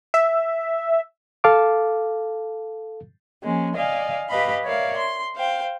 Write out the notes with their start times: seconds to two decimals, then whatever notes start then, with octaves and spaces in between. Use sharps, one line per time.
0.14 E5
1.44 A4 F5 A5 D6
3.43 F3 G#3 A#3 C#4
3.75 D5 D#5 F5 G#5
4.29 G4 B4 D#5 F5 B5
4.64 A#4 C#5 D5 E5 F5
4.97 C6
5.35 C5 F5 G5